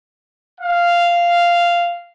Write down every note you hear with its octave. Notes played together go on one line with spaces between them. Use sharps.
F5